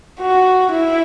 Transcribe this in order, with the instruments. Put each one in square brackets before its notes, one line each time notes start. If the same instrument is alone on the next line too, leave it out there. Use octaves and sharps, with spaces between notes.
[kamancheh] F#4
E4